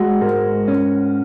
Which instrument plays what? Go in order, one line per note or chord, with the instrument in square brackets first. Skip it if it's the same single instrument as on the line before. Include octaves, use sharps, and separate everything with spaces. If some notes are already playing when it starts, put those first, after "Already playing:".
Already playing: [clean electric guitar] G#3 [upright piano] F#4
[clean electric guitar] G#2 [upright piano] A#4
[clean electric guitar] C#4